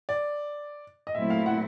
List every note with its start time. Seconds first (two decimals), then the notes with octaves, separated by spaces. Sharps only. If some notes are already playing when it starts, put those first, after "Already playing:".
0.09 D5
1.07 D#5
1.14 A#2 F#3 A3 C4 E4 E5
1.30 F5
1.46 F#5